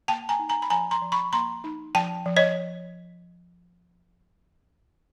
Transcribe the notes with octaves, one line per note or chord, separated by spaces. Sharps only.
A#3 G5 A5
G#5 A#5
D#4
G#5 A#5
B5
F3 G#5 A#5
A#5 C6
F3
B5 C#6
A#3 A#5 C6
D#4
F3 G5 A5
F3
C#5 D#5